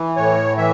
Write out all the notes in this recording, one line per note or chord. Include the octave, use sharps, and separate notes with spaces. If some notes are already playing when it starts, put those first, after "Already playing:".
Already playing: E3
A2 C#5
E3 E5